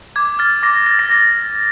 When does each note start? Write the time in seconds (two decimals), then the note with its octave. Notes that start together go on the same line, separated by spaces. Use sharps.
0.16 D6 G#6
0.39 F6 A6
0.63 D6 A#6
0.86 F6 A6
0.99 A#6
1.10 D6 A6
1.34 F6